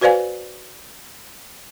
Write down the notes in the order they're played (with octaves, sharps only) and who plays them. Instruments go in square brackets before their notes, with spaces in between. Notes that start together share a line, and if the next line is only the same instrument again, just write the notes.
[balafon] F#4 B4 C5 D5 F5 G#5